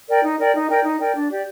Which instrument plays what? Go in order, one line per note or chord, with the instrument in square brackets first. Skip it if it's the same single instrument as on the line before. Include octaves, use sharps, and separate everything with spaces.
[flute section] A#4 D5 G5
D#4
A#4 D5 G5
D#4
A#4 D5 G5
D#4
A#4 D5 G5
D4
G4 D5